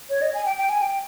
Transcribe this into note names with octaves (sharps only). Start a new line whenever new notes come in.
C#5
D#5
G#5
G5
G5
G#5
G5